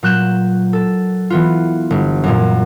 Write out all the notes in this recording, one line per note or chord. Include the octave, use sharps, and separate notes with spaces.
A#2 F#3 F#6 G6 E7
A4
E3 B3 F4
G1
F#2 A#2